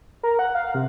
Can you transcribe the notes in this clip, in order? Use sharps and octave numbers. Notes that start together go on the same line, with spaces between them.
A#4
F#5
F5
C3